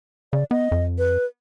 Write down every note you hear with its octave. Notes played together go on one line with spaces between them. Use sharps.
C#3 D5
B3 D#5
F2
B4